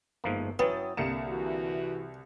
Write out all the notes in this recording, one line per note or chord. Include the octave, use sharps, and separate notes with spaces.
G1 G#2 F3 A#3
F#3 B3 C#4 E4 G5 D#6 A6
C2 D3 A#3 C#7 E7
E3 F#4